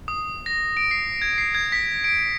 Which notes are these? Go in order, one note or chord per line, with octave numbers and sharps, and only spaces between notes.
D#6
A#6
D7
C7
G#6
C7
G#6
B6
D7